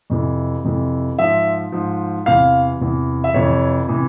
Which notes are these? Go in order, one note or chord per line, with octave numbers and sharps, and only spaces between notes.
F2 C3 E3
F2 C3 E3
G#2 F3 E5
G#2 F3
E2 C3 E3 F5
E2 C3 E3
E5
F2 C3 E3 C#5
C3 E3